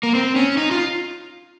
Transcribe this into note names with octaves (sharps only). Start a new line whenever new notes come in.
A#3
C4
C#4
D#4
F4